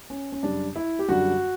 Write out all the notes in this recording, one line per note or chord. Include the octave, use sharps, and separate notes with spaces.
C#4
C#4
F#2 C#3 G3 D4
E4
G4
F#2 D3 G3 F#4